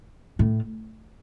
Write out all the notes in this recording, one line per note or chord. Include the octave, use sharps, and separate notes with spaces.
A2